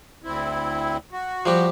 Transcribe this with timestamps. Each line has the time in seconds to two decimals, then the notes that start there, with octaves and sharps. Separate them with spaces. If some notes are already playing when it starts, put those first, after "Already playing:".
0.24 D2 C4 E4
1.12 F#4
1.46 F3 G3 G4